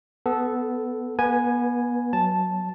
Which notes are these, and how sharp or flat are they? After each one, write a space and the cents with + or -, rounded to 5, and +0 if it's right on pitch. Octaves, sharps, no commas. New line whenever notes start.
B3 +10 A4 -10
B3 -35 B4 +0 G#5 +0
F#3 +0 A5 -5